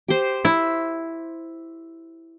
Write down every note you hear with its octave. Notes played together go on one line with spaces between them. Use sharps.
G4 C5
E4